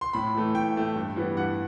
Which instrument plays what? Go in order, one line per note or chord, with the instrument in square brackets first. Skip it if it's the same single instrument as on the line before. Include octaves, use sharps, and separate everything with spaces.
[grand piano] C6
A2 B5
E3 A3
A2 G5
E3 A3
G2
E3 G3 B3
G2 F#5